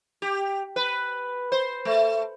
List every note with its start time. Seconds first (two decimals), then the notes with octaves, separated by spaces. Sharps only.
0.22 G4
0.76 B4
1.52 C5
1.85 A3